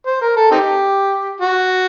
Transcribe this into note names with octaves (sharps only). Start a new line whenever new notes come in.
C5
A#4
A4
C4 D#4 G4
F#4